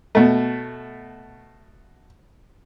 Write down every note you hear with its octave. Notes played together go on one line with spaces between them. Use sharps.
B2 A3